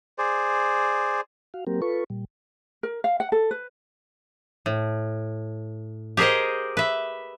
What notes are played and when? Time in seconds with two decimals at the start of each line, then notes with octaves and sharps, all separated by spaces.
0.18 G#4 C5 D5
1.54 F#4 F5
1.67 F#3 A#3 C4 G4 A#4
1.82 F4 A4 B4 C#6
2.10 A#2 G3
2.83 A#4
3.04 F5
3.20 F#5
3.32 A4
3.51 B4
4.66 A2
6.17 G4 G#4 A#4 C5 D#5
6.77 B4 E5